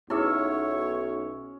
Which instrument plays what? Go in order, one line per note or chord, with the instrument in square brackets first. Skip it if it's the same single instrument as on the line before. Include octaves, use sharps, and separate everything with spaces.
[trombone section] B1 [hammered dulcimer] C#4 E5 [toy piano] E4 G#4 [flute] C#5